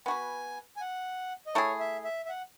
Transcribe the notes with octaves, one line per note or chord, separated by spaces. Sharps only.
B3 F#4 B4 G#5
G#5
F#5
D#5
A3 E4 G#4 C#5
E5
E5
E5
F#5